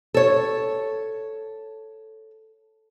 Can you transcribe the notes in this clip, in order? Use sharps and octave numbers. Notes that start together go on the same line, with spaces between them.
A4 C#5